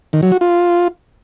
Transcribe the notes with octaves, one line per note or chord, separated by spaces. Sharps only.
D#3
F#3
F#4
F4